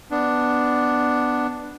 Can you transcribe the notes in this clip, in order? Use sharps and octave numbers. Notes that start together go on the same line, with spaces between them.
B3 D4